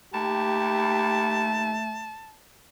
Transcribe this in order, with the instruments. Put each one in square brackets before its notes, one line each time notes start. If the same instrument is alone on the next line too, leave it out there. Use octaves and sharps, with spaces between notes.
[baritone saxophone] D#2 [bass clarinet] A3 [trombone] G4 [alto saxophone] A5